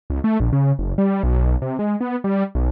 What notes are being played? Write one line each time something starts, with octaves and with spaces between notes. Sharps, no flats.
C#2
A3
A#1
C#3
F#1
G3
B1
C3
G#3
B3
G3
B1